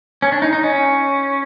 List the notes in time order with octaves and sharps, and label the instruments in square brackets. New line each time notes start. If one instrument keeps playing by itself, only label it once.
[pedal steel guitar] C#4
D4
D#4
D#4
C#4